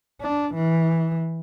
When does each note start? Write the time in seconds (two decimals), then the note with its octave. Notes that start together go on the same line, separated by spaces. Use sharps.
0.21 D4
0.54 E3